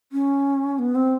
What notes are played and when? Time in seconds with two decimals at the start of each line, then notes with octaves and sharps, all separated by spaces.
0.12 C#4
0.79 B3
0.95 C4